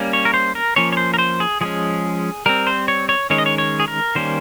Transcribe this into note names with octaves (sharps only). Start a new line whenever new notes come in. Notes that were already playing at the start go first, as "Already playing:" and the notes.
Already playing: G3 A#3 C#4
C#5
A#4
C5
A#4
F3 A#3 C#4 C#5
C#5
C5
A#4
C5
G#4
F3 G#3 C#4 G#4
G3 C4 A#4
C5
C#5
C#5
D#3 G#3 C#4 C#5
D#5
C#5
C#5
G#4
A#4
D#3 G3 A#3 C#4 C5